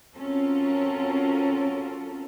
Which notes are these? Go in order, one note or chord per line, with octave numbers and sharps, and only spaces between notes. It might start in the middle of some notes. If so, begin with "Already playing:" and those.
C4 C#4 F4 F#4 A4 A#4